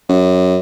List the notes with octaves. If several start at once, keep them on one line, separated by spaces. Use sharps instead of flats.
F#2